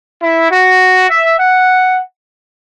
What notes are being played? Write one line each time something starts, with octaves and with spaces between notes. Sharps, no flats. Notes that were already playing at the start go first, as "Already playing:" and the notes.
E4
F#4
E5
F#5